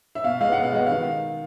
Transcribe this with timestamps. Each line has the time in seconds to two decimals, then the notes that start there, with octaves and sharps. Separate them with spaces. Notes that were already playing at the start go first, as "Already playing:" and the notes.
0.15 E5
0.24 B2 F5
0.41 G#3 B3 F5
0.52 F#5
0.57 B2
0.63 F5
0.73 G#3 B3 F#5
0.86 D#3 F5